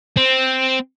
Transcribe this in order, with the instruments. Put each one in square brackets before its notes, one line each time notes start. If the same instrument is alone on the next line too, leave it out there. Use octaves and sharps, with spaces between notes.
[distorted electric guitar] C4